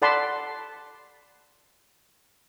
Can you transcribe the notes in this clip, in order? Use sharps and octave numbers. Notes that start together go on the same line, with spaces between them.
A4 D5 F#5 A5 B5 C6